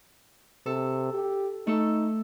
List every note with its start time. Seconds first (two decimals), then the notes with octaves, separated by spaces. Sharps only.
0.66 C3 A4
1.14 G4
1.67 A3 D#4 A4